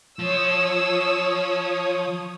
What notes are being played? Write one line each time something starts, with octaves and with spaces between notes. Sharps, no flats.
F3 C#5 D#6 E6